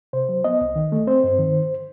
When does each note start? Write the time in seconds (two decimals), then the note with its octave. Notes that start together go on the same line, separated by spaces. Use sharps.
0.13 C3 C5
0.29 F#3
0.44 B3 D#5
0.61 C2
0.76 D#3
0.92 A3
1.07 C4 C5
1.24 G2
1.39 D#3